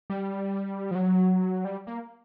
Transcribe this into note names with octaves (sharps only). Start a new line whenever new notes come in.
G3
F3
F#3
G3
A#3